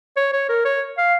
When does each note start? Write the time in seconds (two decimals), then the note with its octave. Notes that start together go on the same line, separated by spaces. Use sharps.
0.16 C#5
0.33 C#5
0.49 A#4
0.65 C#5
0.97 F5